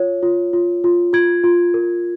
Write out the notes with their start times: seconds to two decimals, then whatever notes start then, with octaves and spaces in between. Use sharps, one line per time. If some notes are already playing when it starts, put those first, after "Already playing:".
Already playing: F4 C#5
0.23 F4
0.53 F4
0.84 F4
1.13 F4 G#6
1.44 F4
1.74 A#4